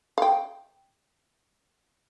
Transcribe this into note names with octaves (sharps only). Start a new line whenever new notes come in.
F5 G5